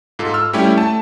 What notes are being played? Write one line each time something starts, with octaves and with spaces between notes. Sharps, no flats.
G#2 F4 A4
E6 F6
G3 A3 C#4 E4 G4
A3 A5